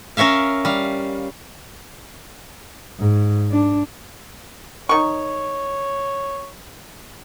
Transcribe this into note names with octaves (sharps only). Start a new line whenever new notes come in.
C#4 A#4 C#5 E5 F5
G3 F5
G#2
D4
D#3 C#5 C#6